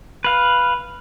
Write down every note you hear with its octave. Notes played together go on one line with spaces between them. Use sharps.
B4 F5